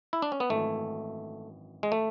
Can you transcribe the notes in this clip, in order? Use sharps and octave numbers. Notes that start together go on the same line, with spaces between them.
E4
D4
C#4
B3
G#1 F#2 E3 A3
G#3
A3